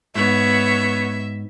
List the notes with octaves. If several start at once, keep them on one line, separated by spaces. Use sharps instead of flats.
G#2 B3 C#5 E5